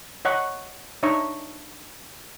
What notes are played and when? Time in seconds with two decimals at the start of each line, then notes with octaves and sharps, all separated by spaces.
0.25 C#5 D#5 F#5 A#5 C#6
1.03 D4 D#4 C#5 E5 A#5 C#6